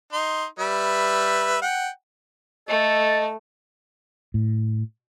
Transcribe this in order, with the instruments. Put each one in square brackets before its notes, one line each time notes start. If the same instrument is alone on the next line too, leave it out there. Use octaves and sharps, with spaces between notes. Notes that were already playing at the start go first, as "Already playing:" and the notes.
[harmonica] D#4 C6
G3 B4 E5
F#5 G5
[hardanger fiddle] A3 [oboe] A4 [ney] D#5
[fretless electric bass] A2